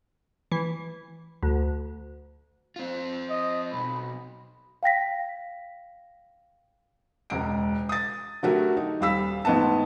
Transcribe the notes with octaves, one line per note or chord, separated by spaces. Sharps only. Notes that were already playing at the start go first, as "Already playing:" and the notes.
E3
D2
C4 F4
D#5
B1 B5
F5 G5 A#6 B6
E1 C#2 D7
D#6 A6
D3 F#3 A3 F#4 G4 A#4
D#4
D#1 G3 F5 B5 E6 B6
A1 G#2 B3 D#5 A5